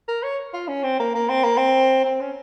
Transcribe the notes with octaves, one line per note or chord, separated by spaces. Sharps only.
A#4
C#5
F4
C#4
C4
A#3
A#3
C4
A#3
C4
C4
C#4